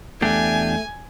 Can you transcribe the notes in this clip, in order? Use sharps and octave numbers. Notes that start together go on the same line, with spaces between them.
E2 A3 D4 G4 G#5